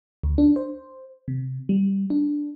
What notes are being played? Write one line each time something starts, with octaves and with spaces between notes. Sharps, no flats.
D2
D4
C5
C3
G3
D4